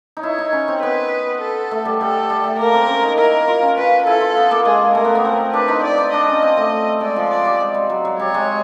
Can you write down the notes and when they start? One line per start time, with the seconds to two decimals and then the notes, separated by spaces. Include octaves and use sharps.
0.17 D#4
0.23 E4 C#5
0.38 D#4
0.53 C#4
0.68 C4
0.82 B3 B4
1.41 A4
1.71 A3
1.85 G3
2.00 G3 A4
2.30 G3
2.44 A3
2.59 A#3 A#4
2.73 C4
2.88 C#4
3.03 D#4
3.17 E4 A#4
3.48 F4
3.62 C#4
3.77 F4 B4
4.06 E4 A4
4.21 F4
4.37 B3
4.51 A#3
4.65 G#3 G#4
4.95 A3 A#4
5.04 B3
5.15 B3
5.25 C4
5.53 D4 B4
5.68 D#4
5.83 D5
5.98 D#4
6.13 D4 D#5
6.28 C#4
6.42 C4
6.57 A3
7.00 G#3 D5
7.16 F3
7.30 D5
7.45 G3
7.60 G#3
7.74 G3
7.90 F#3
8.05 F#3
8.19 G3 C#5
8.34 G#3